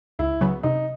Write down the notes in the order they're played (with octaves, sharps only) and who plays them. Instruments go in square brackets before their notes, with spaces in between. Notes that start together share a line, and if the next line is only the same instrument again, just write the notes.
[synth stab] C#2 [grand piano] E4
[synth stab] C#3 F#3 B3
[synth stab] C3 [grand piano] D#4